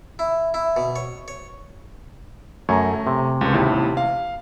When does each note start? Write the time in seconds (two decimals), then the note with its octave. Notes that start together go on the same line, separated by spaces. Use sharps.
0.19 E4
0.54 E4
0.77 B2
0.96 C#5
1.28 C#5
2.69 F#2 A3 C#5 G#5 A#5
3.07 C3
3.41 C#2
3.53 A1 D#2 E4
3.97 F5